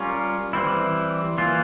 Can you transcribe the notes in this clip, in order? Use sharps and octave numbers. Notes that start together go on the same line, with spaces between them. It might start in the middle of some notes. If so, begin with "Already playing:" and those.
Already playing: G3 C#4 F4 A#4 C#5
E3 G3 C4 E4
E3 A#3 F4